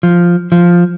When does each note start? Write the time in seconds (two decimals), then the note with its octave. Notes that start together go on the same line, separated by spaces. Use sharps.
0.03 F3
0.52 F3